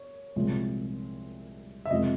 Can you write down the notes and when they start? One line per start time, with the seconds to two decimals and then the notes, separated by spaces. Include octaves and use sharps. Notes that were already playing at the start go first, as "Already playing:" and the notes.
Already playing: C#5
0.36 C2 A#2 F3 G#3
1.85 E5
1.91 F2 C3 F3 G#3 D#5